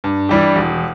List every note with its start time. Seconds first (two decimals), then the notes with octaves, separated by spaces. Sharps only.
0.04 G2
0.29 E3 G3 D4 G4
0.56 E1